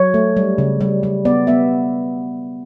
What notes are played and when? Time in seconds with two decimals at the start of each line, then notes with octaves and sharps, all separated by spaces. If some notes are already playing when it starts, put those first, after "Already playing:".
Already playing: F#3 C#5
0.14 A3
0.37 G3
0.58 C#3
0.81 G3
1.03 G3
1.25 B3 D5
1.47 B3 E5